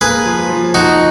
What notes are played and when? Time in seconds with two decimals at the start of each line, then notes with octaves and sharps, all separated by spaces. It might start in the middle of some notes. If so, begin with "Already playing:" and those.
0.01 A#3 G#4 B4
0.26 F3
0.50 F3
0.74 F3 D#4 F#4